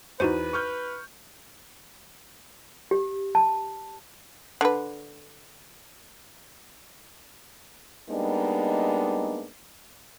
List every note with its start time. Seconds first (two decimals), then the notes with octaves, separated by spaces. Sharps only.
0.20 E2 D#4 F#4 B4 C5 D#7
0.53 C#6 F6 G6
2.91 G4
3.35 A5
4.61 D3 B4
8.09 G3 G#3 A#3 B3 D4 D#4